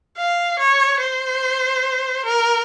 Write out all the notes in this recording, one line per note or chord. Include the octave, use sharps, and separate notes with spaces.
F5
C#5
C5
A#4